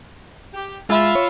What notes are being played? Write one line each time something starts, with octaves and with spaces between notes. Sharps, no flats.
G4
G#3 F4 E5 B5 E6
C#5